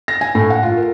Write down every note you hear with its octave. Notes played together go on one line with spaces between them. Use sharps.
A#6
G#5
A2
F#5
F4
A#4